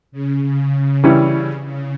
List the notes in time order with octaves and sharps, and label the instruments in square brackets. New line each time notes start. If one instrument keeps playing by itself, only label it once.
[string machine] C#3
C#3
[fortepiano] E3 G3 C#4 E4
[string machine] C#3